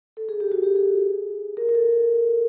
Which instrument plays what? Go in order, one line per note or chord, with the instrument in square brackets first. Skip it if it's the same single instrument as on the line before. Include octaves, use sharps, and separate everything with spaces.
[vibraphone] A4
G#4
G4
F#4
G4
G#4
A#4
A#4
A4
A4